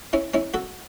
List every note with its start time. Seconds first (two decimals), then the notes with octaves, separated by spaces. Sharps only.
0.13 C#4 E4
0.34 C#4 E4
0.54 F#4 A4